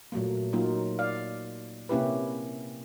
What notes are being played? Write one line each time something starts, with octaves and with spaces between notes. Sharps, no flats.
A#2 F#3 A3 A#3
F#3 A#3 D#4 F4
D5 F5
C3 A#3 C#4 E4 G4 B4